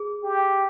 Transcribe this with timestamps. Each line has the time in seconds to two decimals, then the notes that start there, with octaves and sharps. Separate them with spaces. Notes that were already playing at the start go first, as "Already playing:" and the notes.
Already playing: G#4
0.23 G4